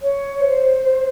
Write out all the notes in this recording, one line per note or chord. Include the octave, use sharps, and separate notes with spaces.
C#5
C5